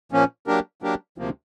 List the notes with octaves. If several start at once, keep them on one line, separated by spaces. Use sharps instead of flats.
A#2 F3 A#3 C#4
F#3 A#3 D4 G4 A#4
F#3 A#3 D4 G4 A#4
D2 C3 F3 A#3